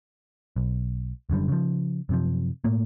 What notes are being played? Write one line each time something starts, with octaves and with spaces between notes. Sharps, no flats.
B1
F#1 F#2 D3 G3
C#3 F3
F#2 C3 F3
A2 A3 A#3